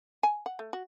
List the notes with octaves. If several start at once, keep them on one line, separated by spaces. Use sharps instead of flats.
G#5
F#5
A3
F#4